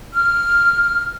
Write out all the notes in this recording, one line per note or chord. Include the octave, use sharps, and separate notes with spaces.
F6